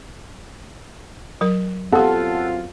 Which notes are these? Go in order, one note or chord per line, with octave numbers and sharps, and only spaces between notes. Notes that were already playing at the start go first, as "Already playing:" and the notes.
F#3 A#4
F#2 B3 C4 F4 G4 A4 F#5 A5